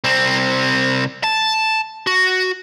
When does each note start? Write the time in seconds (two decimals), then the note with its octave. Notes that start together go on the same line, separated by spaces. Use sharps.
0.04 C2 C4
1.24 A5
2.07 F#4